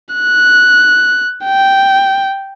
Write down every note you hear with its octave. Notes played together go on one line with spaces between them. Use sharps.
F#6
G5